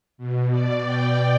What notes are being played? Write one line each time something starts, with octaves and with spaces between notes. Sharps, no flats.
B2
D5
G5